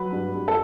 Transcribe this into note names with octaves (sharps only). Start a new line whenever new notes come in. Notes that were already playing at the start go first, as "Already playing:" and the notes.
Already playing: F#3 B4
G2
G2
A4